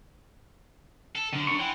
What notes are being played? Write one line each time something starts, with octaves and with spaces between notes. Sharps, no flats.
A4
F#2 D3
D4 C#6
E3 F#5 G5 C6